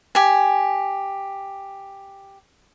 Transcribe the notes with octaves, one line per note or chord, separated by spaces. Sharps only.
G4 G#5